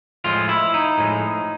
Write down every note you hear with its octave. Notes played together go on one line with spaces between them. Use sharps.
A2 F3 G#3 F4
E4
D#4
A2 F3 G#3